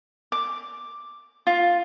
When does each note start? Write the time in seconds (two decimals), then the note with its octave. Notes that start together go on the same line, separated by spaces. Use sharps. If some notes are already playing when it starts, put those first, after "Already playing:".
0.32 D6
1.47 F4